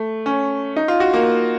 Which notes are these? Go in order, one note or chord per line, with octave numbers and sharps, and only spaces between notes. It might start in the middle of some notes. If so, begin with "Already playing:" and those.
Already playing: A3
C#4
D#4
F4
F#4
A#3